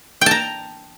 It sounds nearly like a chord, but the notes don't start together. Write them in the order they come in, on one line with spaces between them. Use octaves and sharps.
G5 A5 A#5